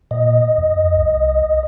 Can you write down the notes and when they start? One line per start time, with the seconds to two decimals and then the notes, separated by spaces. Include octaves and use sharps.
0.11 A#2 D#5
0.58 F2
0.97 C2